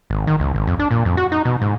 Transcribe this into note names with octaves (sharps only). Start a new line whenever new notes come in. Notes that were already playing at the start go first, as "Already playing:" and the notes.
G#1
D#3
C#2
G#1
F2
D4
A#2
F2
F#4
D#4
B2
G#2